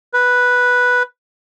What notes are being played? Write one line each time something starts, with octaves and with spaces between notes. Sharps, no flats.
B4